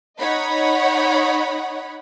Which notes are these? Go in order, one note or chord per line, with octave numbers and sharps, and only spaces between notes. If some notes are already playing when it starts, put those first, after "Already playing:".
D#4 C#5 D#5 F#5 B5